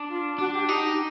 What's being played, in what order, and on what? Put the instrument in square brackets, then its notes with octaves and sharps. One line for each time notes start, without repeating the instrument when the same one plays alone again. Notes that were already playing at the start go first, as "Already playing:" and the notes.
Already playing: [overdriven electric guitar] D4
[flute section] F4
[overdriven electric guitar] D4 [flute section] F#4
[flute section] G4
F#4
[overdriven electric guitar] D#4 [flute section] G4